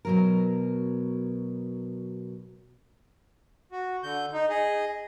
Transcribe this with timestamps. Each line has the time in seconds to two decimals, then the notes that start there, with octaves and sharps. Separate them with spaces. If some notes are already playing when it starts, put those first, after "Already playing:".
0.05 B2 F#3 A#4
3.72 F#4
4.03 D3 G6
4.33 D#4
4.49 G#4 D#5